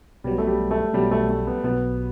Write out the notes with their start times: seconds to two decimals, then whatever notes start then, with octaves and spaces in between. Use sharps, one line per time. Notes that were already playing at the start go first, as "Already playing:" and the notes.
0.24 B1 B2 F#3 G3
0.38 A3
0.47 G3
0.71 A3
0.94 B1 B2 F#3 G3
1.11 A3
1.29 A3
1.47 B3
1.64 B1 B2 F#3 B3